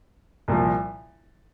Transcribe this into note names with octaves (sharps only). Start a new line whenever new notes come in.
C2 A#2 F3